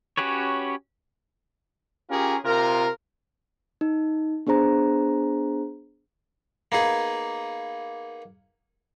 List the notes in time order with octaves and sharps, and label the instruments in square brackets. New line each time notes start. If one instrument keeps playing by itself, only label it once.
[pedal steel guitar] C#4 F#4 G4 B4 C#5
[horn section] C#4 F4 G4 G#4 A#4
C3 F4 A#4
[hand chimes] D#4
B3 D4 G#4 C5 A#5
[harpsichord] A#3 B3 D#4 G#4